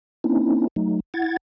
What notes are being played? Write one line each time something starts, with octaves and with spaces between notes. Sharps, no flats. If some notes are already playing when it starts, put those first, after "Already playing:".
A#3 C4 C#4 D#4 E4
F#3 A3 D#4
E4 F#5 G#6 A6